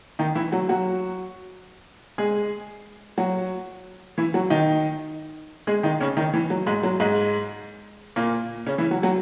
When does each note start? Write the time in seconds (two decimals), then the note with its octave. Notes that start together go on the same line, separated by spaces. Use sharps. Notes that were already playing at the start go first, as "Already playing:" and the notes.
0.19 D#3 D#4
0.35 E3 E4
0.52 F#3 F#4
0.69 F#3 F#4
2.18 G#3 G#4
3.18 F#3 F#4
4.18 E3 E4
4.34 F#3 F#4
4.50 D#3 D#4
5.67 G#3 G#4
5.83 D#3 D#4
6.01 C#3 C#4
6.17 D#3 D#4
6.34 E3
6.50 F#3
6.66 G#2 G#3
6.83 F#3
7.00 G#2 G#3
8.16 A#2 A#3
8.66 C#3 C#4
8.78 E3 E4
8.91 F#3 F#4
9.03 F#3 F#4